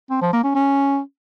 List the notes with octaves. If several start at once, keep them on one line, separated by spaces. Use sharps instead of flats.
C4
F3
A#3
C#4
C#4